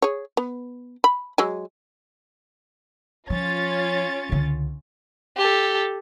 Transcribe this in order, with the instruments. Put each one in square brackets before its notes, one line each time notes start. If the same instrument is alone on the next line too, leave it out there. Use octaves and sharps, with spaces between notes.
[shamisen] G#4 C#5
B3
B5
F#3 G#3 G#5
[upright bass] F3 [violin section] C#4 F4 A6
[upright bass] C#2 D3
[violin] G4 A4